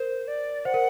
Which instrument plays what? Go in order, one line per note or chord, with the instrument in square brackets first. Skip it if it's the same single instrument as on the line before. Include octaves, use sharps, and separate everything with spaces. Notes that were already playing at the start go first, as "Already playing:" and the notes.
Already playing: [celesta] A#4 [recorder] C5
[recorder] D5
[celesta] C5 [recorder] F#5
[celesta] A#4